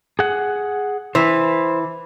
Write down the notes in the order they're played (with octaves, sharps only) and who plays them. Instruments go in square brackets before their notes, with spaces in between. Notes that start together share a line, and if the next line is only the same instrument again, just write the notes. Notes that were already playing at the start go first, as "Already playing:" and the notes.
[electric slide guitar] G#4 F#5
[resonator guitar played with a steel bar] E3 [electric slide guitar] C5